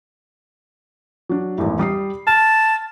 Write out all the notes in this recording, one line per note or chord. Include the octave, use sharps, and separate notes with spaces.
F#3 D4
G#1 E2 A2
G3 D#6 C7
A5 F6